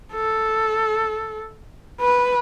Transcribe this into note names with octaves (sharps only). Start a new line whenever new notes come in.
A4
B4